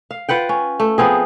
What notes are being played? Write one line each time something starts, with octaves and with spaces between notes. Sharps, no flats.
F5
F4 B4 F#5 G5
C#4
A3
F3 B3 C4 G#4